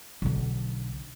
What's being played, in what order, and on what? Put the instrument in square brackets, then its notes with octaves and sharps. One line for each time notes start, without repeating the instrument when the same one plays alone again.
[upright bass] B1 D3